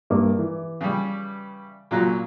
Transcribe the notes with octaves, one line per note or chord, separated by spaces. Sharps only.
G2 A#3 D6
E3
C#3 G3
A#2 C#3 F#3